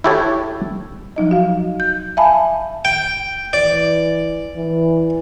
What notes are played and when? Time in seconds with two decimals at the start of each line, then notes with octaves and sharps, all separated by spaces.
0.04 E4 F#4 G4 A4 C#5
1.16 F3 F#3 D#4 D#5
1.31 F#4 F5
1.80 G6
2.17 E5 F5 G#5 A5 B5
2.85 G5
3.53 E3 D5
4.57 E3